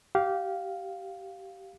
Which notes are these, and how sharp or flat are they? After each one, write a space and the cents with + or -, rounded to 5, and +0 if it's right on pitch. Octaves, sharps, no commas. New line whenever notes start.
G4 -20 F5 +0